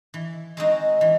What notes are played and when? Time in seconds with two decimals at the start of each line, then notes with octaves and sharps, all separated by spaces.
0.14 E3
0.57 G#3 C4 D#4 F#4
1.01 E3